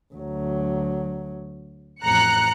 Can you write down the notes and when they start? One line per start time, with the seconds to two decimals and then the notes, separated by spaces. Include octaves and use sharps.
0.14 D2 F#3
2.03 A1 F2 A#5 F#6 C#7